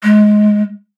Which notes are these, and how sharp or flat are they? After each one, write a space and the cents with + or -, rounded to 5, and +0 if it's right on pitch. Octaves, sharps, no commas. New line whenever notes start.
G#3 +15